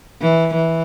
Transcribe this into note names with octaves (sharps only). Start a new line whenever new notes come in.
E3
E3